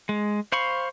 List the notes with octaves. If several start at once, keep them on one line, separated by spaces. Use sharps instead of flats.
G#3
C5 F5 B5 C#6